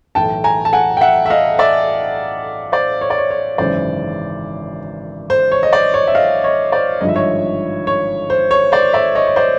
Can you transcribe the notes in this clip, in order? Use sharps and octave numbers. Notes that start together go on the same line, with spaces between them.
B1 A2 E3 G5 A5
G#5 A#5
A5
F#5 G#5
G5
E5 F#5
E5
D#5 F5
D5 E5
C5 D5
C#5
D5
C#5
C#5
G#1 F#2 C#3 E3 C5 D5
C5
C#5
D#5
C5 D5
C#5 D#5
E5
D#5 F5
C#5 D#5
C5 D5
G#1 G2 D3 F3 D#5
E5
C#5 D#5
C#5
C5
C#5
C5 D5
D5 E5
C#5 D#5
C#5
C5 D5